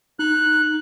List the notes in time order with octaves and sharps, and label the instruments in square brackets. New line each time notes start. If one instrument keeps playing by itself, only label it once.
[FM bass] D#4 [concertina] F#6